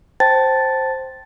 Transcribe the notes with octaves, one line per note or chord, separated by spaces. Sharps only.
C5 G5 A5 A6